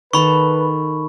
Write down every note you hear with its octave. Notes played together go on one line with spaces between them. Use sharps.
D#3 A4 B4 B5 C#6